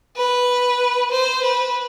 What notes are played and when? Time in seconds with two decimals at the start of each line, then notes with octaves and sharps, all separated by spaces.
0.17 B4
1.11 C5
1.43 B4